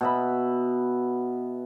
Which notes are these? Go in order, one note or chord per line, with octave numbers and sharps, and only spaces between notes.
B2 E5 B5